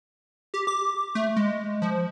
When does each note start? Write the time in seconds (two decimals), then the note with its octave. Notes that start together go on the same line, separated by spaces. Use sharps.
0.54 G4
0.67 D6
1.15 A3
1.36 G#3
1.82 F3